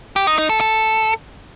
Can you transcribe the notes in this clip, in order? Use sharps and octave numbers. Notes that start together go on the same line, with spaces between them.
G4
D#4
D#4
A4
A4